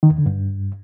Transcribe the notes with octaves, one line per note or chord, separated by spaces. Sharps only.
D#3
E2
D3
G2